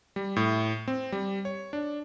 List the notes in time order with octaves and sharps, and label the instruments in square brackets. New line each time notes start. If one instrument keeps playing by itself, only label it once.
[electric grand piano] G3
A2
C4
G3
C#5
D4